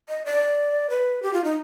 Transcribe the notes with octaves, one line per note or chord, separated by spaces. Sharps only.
D#5
D5
B4
G4
F4
D#4